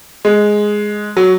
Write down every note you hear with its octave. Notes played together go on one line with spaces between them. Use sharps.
G#3
F#3